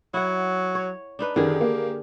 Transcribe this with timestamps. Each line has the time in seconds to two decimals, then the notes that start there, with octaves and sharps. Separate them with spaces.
0.14 F#3 E4 F#5
0.75 C#5
1.19 D4 D#4 B4
1.36 F#2 D3 D#3 G4 G#4
1.61 A#3